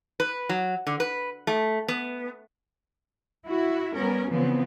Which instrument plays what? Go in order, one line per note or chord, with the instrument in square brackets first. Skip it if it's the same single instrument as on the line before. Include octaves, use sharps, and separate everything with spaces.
[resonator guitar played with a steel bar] B4
F#3
D3
B4
A3
B3
[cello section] E4 F#4
G3 B3 C#4 A#4
C#3 E3 F3 B3 C4